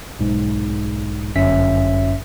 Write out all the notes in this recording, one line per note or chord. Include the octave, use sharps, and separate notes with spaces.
B1 G#2
G1 F#2 C#4 E5 B6